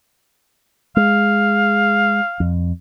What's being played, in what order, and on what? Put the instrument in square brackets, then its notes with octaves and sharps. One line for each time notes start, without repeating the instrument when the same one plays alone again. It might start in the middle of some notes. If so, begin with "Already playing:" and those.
[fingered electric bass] G#3 [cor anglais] F5
[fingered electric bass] F2